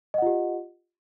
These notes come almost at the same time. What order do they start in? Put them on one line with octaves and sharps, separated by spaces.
D#5 F#5 F4 G4